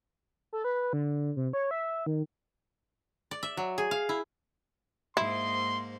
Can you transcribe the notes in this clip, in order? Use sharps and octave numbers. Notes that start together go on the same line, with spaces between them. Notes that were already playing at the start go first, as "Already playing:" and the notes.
A4
B4
D3
C3
C#5
E5
D#3
D5
E5
F#3
G#4
F5
E4
G#2 A#3 E4 C5 C6